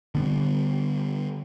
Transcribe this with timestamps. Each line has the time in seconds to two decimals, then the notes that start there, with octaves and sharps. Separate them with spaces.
0.15 D3 G3 B3